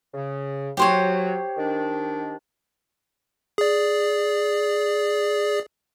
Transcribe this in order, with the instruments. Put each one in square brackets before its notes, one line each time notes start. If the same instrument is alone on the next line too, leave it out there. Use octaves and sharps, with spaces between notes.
[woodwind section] C#3
[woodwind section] F#3 [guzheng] G4 C5 C#5
[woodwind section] D#3 D4
[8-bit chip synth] G#4 D5